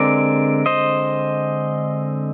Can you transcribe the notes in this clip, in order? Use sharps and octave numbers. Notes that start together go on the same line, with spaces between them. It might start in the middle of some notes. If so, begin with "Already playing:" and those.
Already playing: D3 G#3 C4 A#4 D5
C5 D#5